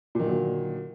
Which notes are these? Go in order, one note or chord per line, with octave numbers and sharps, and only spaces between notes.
A#2 D3 D#3 F#3